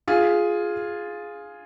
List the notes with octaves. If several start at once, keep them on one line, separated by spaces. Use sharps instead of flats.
F4 G#4